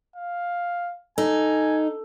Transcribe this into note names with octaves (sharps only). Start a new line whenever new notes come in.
F5
D#4 A4 G#5